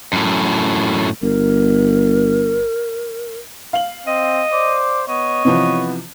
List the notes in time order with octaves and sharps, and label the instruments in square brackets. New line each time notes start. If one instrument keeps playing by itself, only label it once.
[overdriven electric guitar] F#2 A2
[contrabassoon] G1 [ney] A#4
[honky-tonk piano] F5 F#7
[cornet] C4 [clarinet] D#5
[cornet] C5 [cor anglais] D5
[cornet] B3 [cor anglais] C#5 [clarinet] D#5
[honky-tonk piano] C3 E3 F3 [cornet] B3